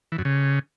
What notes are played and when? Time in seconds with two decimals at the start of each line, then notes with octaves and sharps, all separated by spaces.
0.12 E3
0.18 F#2
0.25 C#3